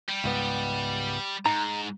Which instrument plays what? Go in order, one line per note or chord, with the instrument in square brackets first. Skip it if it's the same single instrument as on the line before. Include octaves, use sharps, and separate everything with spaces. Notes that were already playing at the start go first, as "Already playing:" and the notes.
[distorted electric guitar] G3
[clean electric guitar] C#2 G#2 B3
[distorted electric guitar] G#2 [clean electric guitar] D#4 A#5